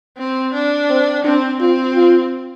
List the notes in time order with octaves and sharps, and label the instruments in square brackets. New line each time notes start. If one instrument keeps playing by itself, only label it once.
[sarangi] C4
D4
[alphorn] C4
[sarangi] C4 [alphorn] D4
[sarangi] C4 [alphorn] F4
[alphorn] F4